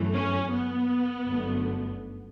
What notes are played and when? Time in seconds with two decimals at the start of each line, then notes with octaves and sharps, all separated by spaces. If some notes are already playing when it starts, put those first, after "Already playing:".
Already playing: G1 F#2 E3 A3
0.13 C#4
0.51 B3
1.27 G1 F#2 D3 A3